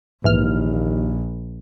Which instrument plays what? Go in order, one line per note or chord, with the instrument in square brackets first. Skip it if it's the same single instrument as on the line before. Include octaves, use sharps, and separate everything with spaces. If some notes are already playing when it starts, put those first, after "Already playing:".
[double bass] A#1 [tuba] D#2 [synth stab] G#2 E3 F6